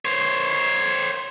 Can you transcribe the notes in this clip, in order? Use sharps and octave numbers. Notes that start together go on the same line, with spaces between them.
C5 C#5